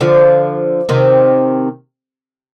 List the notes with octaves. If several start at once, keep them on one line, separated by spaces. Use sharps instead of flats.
D3 F3
C3 D#3